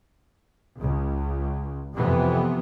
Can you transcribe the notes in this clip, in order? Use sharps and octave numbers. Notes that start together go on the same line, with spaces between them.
C#2
F2 C3 E3 B3